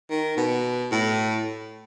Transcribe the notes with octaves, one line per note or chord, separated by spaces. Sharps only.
D#3
B2
A2